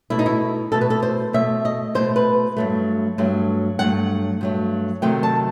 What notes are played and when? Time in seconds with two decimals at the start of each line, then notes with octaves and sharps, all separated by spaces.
0.10 B2 A3 E4
0.19 D#4
0.26 E4
0.72 B2 A3 A4
0.81 B4
0.90 A4
1.02 C5
1.33 B2 A3 E5
1.65 D#5
1.95 B2 A3 C5
2.16 B4
2.57 G2 F#3 A3
3.18 G2 F#3 A3
3.79 G2 F#3 A3 F#5
4.41 G2 F#3 A3
5.02 C3 D#3 F#3 A3 G5
5.23 A5